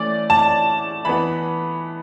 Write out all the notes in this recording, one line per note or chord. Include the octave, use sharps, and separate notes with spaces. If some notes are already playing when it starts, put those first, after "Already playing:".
Already playing: E3 A3 C#4 D5
A5
E3 B3 B5